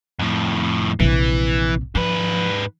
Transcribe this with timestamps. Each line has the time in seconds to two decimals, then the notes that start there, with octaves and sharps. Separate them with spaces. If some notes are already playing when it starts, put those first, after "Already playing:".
0.19 F2 A2
1.00 A#1 C3 E3
1.95 G#2 F3 B4